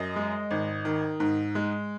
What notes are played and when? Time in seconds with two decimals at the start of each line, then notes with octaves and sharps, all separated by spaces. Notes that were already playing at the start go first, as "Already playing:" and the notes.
Already playing: F#2 D#5
0.16 G#3
0.51 G#1
0.85 D#3
1.20 G#2
1.55 G#3